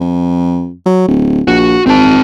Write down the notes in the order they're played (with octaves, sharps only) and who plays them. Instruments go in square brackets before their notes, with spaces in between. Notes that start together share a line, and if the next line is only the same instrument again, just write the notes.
[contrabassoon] F2
F#3
D1
[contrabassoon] A#1 [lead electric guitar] F#4
[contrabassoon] G#1 [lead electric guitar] C4 A5